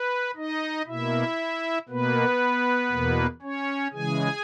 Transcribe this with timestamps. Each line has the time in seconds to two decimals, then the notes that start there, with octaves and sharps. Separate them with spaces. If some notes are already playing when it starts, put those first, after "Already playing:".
Already playing: B4
0.36 D#4 D#5
0.87 B2 A#3 E4 E5
1.89 B2 A#3 B3 B4
2.91 E2 B2 A#3
3.42 C#4 C#5
3.93 C#3 E3 G#3 G#4 G#5